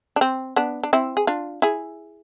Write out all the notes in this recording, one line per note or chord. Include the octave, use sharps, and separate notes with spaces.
D4
C4
B3 D4
D4
C4 E4
G#4
D4 F4
E4 G#4